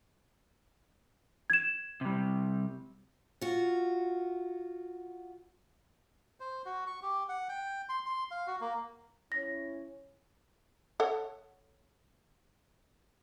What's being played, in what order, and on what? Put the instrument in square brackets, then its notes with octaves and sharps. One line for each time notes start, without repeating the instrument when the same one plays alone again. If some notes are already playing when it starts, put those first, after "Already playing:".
[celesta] G#6 E7
[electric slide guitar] C3 G3
[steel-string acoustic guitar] F4 F#4
[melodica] C5
F#4
C#6
G4
F#5
G5
C6
C6
F5
F#4
A#3
[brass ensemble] C#4 E4 C#5 [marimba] A#6
[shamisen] A4 C#5 F#5